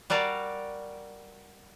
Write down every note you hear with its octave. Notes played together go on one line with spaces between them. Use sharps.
G3 F#4 A#4 D5 F5